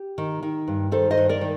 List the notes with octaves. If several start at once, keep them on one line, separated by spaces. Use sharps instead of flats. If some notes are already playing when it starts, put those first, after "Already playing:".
Already playing: G4
D#3
D#3
G2
D#3 A4 C5
C5 D#5
G2
A#4 D5
D#3